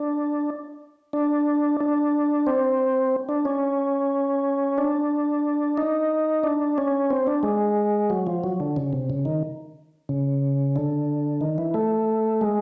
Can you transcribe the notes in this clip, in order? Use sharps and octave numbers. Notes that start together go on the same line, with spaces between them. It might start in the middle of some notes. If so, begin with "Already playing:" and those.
Already playing: D4
D4
D4
C4
D4
C#4
D4
D#4
D4
C#4
C4
D4
G#3
F#3
F3
F#3
D3
C#3
C3
C#3
D#3
C#3
D3
D#3
E3
A3
G#3